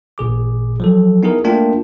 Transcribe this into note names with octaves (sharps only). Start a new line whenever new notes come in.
A1 A#2 G#4 D6
F3 F#3 A4
B3 D#4 E4 G#4 A#4
A3 A#3 D4 F4 A#4 G5